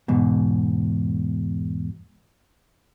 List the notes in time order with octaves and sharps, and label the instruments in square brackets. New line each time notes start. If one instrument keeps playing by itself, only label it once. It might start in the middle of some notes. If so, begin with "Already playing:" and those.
[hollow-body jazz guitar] E2 G#2 B2